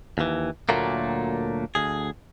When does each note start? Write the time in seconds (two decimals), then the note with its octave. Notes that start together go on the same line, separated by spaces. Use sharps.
0.18 D#2 E3
0.69 D2 A#2 F#3 A3 A#3
1.75 D2 G#4